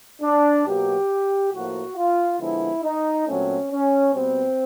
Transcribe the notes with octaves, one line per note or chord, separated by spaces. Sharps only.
D4
B2 F#3 A#3 G4
A2 F3 A#3 F#4
F4
D3 F3 G#3 B3 E4
D#4
A#2 F#3 A3 C4 C#4
C#4
B2 G3 B3 C4